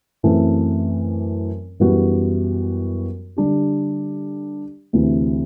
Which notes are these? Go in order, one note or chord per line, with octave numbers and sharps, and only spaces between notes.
F#2 E3 A3 C4
F#2 E3 G3 B3 F#4
D3 G3 D4 G4
D2 C3 E3